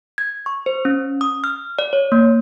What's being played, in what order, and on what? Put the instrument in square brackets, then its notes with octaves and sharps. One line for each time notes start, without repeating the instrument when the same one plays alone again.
[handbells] G#6
C#6
C5
C#4
D#6
F6
D5
C#5
A#3